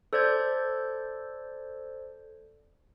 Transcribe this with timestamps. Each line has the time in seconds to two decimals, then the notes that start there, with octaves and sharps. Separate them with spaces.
0.13 A4 C5 D5 G6 G#6